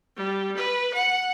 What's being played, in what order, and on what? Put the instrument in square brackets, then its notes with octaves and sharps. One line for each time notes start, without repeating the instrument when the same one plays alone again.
[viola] G3
B4
F#5